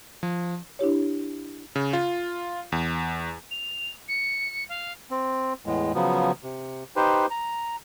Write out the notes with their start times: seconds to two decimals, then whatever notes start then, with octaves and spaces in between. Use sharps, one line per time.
0.23 F3
0.79 D4 E4 G4 C#5
1.76 C#3
1.93 F4
2.72 E2
3.51 F7
4.08 C#7
4.69 F5
5.11 C4
5.66 E2 A2 G#3
5.95 C#3 F3 F#3 B3
6.43 C3
6.96 D#4 G4 B4 C5
7.31 A#5